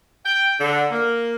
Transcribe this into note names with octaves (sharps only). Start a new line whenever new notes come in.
G5
D3
A#3